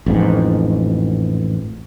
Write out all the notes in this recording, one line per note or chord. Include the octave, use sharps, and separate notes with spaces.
A1 F2 G#2